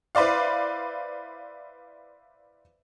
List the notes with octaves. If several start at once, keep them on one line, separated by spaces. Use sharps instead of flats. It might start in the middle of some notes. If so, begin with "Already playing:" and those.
E4 B4 C5 D5 F5